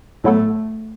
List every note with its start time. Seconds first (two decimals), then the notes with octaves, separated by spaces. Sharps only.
0.24 A2 F#3 A3 B3 E4 A4